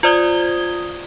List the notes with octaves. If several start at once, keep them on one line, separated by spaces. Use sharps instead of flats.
F4 C5 D5 D#6 G#6 G7